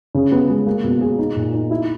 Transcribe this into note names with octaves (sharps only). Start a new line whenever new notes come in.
C#3
B3
G#3
A#3
B2
G#4
D#4
A#2
D#4
E4